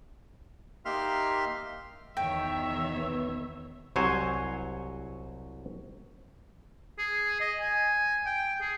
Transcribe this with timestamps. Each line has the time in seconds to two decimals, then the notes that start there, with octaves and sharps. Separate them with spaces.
0.85 A#3 D#4 G4 E5 C6 F6
2.17 E2 B2 D#3 C#5 E5 G5
2.97 B3
3.96 C2 F#3 C5 C#5 G#5
6.98 G#4
7.41 D#5
7.61 G#5
8.26 G5
8.61 G#4